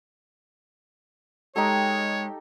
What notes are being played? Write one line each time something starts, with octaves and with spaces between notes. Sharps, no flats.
G#3 D#4 G4 A4 C#5